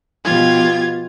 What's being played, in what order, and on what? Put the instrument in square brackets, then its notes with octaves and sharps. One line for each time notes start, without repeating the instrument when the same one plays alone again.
[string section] B2 F3 G4 [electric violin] F4 G#6